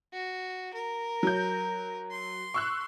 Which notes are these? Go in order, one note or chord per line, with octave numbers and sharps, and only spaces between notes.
F#4
A#4
F#3 G6
C6
C#6 E6 F#6